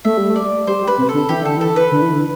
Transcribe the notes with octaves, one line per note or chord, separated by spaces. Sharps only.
A3 E5
G3
A3
D5
G3 C5
G3
B4
C3
D3 A4
E3 G4
D3 A4
E3 A4
B4
D3
E3
D3